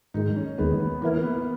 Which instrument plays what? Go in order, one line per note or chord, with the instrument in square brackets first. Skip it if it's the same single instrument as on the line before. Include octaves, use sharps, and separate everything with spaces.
[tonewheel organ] G#2 D#3 G#3 [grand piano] D#4
[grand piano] C#4
[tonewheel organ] D#2 D#3 G#3 [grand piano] B3
[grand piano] B3
[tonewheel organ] E3 B3 E4 A#4 [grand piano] A#3
[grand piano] B3